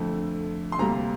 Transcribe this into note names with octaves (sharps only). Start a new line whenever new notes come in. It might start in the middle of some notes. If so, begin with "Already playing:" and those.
Already playing: F2 D3 A3
C6
D2 C3 G3 A#3 A#5